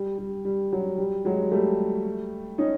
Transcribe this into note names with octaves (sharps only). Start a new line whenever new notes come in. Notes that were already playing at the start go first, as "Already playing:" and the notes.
Already playing: G3
G3
G3
F#3
G3
F#3 G#3
G3 A3
C#4 D#4